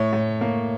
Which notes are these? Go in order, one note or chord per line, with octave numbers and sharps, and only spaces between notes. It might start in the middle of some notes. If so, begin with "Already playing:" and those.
Already playing: A2 C#5
A2
A#3